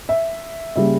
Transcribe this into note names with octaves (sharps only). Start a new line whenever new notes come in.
E5
C#3 G3 A#3 E5